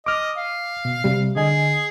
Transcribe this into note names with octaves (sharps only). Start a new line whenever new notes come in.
D#5 D6 F6
F5
B2
C3 G3
D3 G#4 D#5 G#5